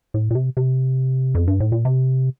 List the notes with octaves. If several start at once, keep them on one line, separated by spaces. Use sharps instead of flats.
A2
A#2
C3
C3
F2
G2
A2
A#2
C3